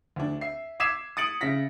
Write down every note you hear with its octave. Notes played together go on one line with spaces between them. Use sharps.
D2 D4
E5 C7
D6 E6 G#6 B6 C7 E7
D#6 A6 C#7 D7 F#7
C#3 E5 A#6 B6